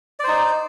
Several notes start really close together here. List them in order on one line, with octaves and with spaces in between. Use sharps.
D5 C5 D#4